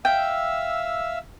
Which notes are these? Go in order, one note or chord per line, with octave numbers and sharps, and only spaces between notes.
E5 F5 G5 E6